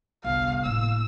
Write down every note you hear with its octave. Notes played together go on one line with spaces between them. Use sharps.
G1 C2 F5
A2 A#3 E6